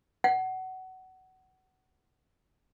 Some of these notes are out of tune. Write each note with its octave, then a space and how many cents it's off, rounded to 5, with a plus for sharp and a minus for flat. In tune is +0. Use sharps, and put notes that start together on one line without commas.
F#5 +20